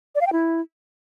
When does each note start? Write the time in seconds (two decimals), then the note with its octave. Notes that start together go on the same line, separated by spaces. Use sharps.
0.15 D5
0.21 F5
0.27 G5
0.33 E4